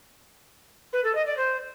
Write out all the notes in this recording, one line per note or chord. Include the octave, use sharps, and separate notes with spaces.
B4
A4
D#5
D5
C5